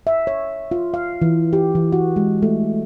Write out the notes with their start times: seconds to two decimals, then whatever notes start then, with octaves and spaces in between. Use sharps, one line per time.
0.07 E5
0.27 C#5
0.71 F4
0.94 F5
1.22 E3
1.53 G4
1.75 E3
1.92 F#4
2.16 G#3
2.42 A3